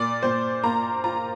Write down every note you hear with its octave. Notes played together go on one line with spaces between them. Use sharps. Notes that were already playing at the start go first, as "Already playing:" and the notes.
Already playing: A#2 D5
A#2 C5
A#3 A#5
F4 A#5